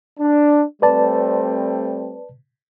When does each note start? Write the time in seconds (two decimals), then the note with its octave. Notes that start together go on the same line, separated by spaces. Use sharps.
0.19 D4
0.82 G3 A3 C4 B4 D5 A5